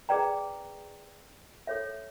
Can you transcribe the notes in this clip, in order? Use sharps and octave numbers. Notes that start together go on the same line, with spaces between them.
G#4 B4 D5 G5 A#5
A4 C#5 E5